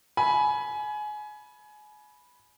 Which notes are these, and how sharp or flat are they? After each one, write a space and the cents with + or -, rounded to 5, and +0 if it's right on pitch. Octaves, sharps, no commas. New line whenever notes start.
G#5 +25 B5 -5